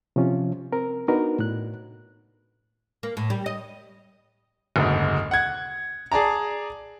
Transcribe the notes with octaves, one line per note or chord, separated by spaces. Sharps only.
C3 F3 C#4 F4
C4 A#4
B3 D4 D#4 F#4 A#4 B4
A2 F#6
A#3
A2
G3
D#5
F#1 D2 G#2
F#5 G#6
G#4 D5 A5 A#5